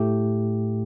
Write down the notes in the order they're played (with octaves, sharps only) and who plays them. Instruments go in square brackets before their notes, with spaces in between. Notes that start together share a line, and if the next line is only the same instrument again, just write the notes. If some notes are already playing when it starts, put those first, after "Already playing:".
Already playing: [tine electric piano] A2 A3 G4